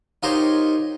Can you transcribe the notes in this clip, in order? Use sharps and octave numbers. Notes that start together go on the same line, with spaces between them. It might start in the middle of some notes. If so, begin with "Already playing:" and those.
D#4 F4 G4 A#4 C5 C#5